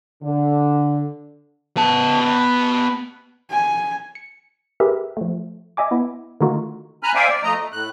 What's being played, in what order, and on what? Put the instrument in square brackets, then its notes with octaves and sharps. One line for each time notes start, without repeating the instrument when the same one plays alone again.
[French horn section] D3
[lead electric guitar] B3 A5
[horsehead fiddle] G#5
[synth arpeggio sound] C#7
G4 G#4 A#4 B4 E5
F3 A3
D#5 E5 G#5 D6
B3 E4
D3 D#3 A3 D#4 F4 F#4
[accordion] G#5 A#5 B5 F6 F#6
C5 D5 E5 F5 G5 G#5
D5
F3 A3 D#5 A#5
A3
A2 F#6